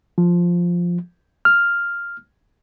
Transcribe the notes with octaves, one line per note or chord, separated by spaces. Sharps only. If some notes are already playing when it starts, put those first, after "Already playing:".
F3
F6